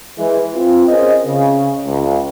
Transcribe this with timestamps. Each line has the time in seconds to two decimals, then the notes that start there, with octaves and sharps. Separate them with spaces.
0.18 E3 G#3
0.55 C4 F4
0.88 C#4 G#4 A#4 C5 D#5
1.26 C#3
1.86 C#2